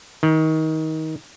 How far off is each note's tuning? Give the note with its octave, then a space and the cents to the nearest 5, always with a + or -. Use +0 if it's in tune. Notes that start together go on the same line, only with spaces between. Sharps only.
D#3 +25